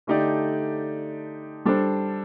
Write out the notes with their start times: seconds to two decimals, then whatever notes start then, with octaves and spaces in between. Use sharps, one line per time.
0.07 D3 A3 D#4 G4 D5
1.65 G3 D4 A4 C5